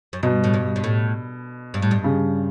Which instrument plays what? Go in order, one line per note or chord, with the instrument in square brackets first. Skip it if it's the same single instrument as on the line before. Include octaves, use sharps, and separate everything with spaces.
[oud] F#2
[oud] G2 [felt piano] B2
[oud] A2
G2
G2
A2
G2
A2
G2
[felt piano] C#3